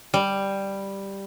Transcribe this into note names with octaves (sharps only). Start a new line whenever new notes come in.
G3